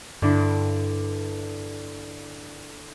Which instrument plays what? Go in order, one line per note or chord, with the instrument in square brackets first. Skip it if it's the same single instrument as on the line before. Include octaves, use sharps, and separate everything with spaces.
[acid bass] G2 [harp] D3 D4 E4